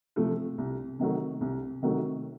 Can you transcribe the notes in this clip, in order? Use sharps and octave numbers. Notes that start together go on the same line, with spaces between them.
C3 F3 A3
C2
C3 D#3 F#3 A3
C2
C3 D#3 F#3 A3